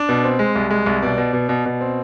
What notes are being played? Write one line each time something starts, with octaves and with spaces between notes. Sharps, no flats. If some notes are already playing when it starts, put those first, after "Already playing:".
Already playing: D4
B2
C4
G#3
C2
G#3
C2
B2 D5
B2
B2
B2
B2
C4